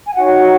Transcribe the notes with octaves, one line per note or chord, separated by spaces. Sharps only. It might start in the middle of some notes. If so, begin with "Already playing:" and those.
G#5
D#4 F#4 C#5 F#5